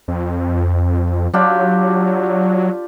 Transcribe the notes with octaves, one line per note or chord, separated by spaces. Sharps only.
F2
F#3 D4 F4 G4